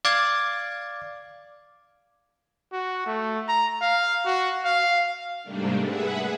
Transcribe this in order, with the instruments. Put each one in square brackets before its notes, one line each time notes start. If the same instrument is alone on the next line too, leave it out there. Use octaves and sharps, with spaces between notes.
[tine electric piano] D5 F5 D6 G#6
[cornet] F#4
A3
A#5
F5
F#4
F5
[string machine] G#2 C3 G3 A3 A#3 D4
G#4 B4 E5 F#5